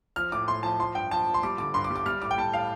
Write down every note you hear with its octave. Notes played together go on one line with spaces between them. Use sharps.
F3 F6
A2 D6
A2 C6
F3 A5
F3 C6
G2 G5
F3 A5
F3
C6
G3 D6
D3 D6
G2 C6
D6
G3
D6
G3 F6
A2 D6
G5
G3 A5
A2 F5